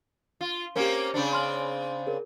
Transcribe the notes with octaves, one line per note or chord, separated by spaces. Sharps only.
F4
A#3 C4 C#4 G4 A#4
C#3 C4 D4
C6 F6 F#7
G#4 A#4